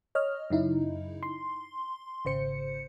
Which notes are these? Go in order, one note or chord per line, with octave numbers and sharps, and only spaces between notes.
C#5 D#5 F6
F#2 C#3 D#4 E4
C6
G#1 C#3 C5 C#7